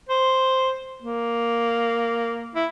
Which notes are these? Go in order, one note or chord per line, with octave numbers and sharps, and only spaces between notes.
C5
A#3
E4